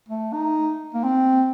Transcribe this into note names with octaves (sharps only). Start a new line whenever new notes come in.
A3
D#4
A#3
C4